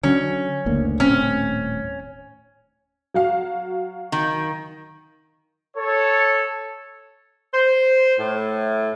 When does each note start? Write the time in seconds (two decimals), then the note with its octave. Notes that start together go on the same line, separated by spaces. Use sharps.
0.03 D3 F#3 C#4
0.66 F#1 D2 A#3
1.00 D#1 A2 C4 C#4
3.14 F#3 F#4 F5
4.12 D#3
5.77 A4 C#5
7.54 C5
8.19 A2